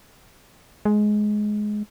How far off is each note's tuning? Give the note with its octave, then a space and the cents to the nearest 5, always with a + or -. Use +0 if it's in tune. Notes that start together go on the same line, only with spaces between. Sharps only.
G#3 +15